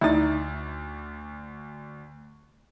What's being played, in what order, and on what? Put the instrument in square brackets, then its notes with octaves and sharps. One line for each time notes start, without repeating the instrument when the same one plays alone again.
[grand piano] D2 D5 A6 [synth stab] D#4 E4